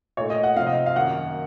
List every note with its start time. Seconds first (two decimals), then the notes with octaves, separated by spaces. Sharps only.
0.17 A#2 A3 D#4 C#5
0.30 D#5
0.43 F#5
0.56 C3 F3 C4 D#4 F5
0.67 D#5
0.86 F5
0.96 F#2 D#3 A#3 F#5